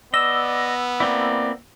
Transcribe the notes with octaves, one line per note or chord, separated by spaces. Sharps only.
B3 D5 D#5 E6
A#3 C4 E4 D5